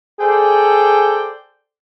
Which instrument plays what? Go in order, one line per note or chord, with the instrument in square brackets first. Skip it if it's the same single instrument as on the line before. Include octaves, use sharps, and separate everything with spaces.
[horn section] G#4 A4 C5 D5 G5